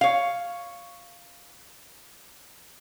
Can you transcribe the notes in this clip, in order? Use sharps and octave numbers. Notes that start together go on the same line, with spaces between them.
C#5 F5